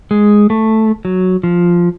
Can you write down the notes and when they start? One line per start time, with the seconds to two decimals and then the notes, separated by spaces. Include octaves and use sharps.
0.11 G#3
0.50 A3
1.05 F#3
1.43 F3